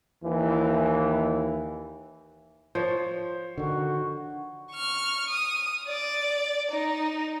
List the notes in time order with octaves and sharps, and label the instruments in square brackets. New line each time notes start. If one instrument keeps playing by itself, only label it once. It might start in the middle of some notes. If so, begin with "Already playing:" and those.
[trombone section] D#2 E3
[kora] F3 [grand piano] C5 C#5
[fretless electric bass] D3 D#3 [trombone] F#4
[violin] C#6 F6
D#6
D5
D#4